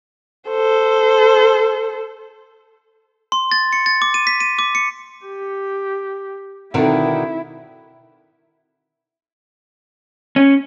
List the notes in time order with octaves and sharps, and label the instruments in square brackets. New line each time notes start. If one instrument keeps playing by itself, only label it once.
[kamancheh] A4 C5
[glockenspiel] C6
A6
C#7
A6
D6
D#7
B6
D#7
D6
C#7
[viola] G4
[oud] B2 D3 D#3 [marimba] C4 D#4 A4 [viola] E4
[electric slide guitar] C#4